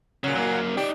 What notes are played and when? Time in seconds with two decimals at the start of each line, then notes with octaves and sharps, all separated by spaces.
0.24 A#2 C#3 F#3
0.35 F#2 A#3
0.77 D#4 G4 D5